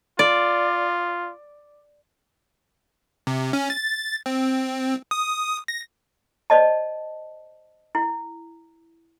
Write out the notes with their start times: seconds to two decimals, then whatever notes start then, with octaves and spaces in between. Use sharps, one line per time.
0.19 F4 D5
3.27 C3
3.53 C#4
3.70 A6
4.26 C4
5.11 D#6
5.68 A#6
6.50 C5 D5 D#5 A5
7.95 E4